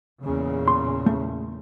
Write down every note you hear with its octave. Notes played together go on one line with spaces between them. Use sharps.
E2 A#2 C#3
C6
A3